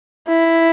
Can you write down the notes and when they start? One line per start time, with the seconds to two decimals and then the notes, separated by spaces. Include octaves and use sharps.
0.29 E4